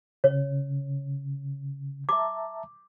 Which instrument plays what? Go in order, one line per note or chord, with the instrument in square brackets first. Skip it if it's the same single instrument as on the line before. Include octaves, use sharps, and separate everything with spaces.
[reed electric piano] C#3 [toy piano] C#5
[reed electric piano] E5 A5 A#5 [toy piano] D6